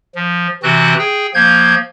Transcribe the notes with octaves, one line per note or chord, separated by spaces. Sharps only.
F3
C3 E3 C4 F#4 F#6
G#4 G5
F3 A#3 G6 G#6